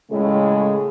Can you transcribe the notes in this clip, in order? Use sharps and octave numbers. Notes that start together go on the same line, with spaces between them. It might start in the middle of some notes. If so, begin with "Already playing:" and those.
A2 C#3 G#3 G#4